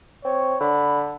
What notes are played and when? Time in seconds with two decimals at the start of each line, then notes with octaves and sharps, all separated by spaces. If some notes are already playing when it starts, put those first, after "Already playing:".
0.25 C4 C#5
0.61 D3 B5